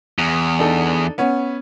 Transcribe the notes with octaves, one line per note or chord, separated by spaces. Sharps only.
E2
D4 D#4 A4
B3 C#4